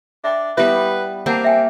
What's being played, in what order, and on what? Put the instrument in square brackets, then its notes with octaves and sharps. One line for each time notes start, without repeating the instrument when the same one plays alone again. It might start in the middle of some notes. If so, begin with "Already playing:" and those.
[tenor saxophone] D4 [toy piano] E5 G5
[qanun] G3 B3 G4 [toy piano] E4 E5 [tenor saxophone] B4
[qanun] A#3 G4 [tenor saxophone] C4 [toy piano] F5 F#5 A5
[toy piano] E5 G5 G#5